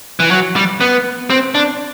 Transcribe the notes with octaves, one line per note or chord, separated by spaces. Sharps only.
E3
F#3
G3
B3
C4
D4